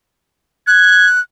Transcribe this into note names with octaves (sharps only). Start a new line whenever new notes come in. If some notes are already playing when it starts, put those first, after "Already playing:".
F#6 G#6